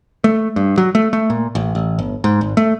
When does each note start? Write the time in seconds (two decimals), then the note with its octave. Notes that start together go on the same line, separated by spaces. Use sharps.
0.24 A3
0.56 G2
0.78 F#3
0.95 A3
1.13 A3
1.30 A#2
1.55 A1
1.75 A1
1.99 G1
2.24 G#2
2.41 G#1
2.57 A3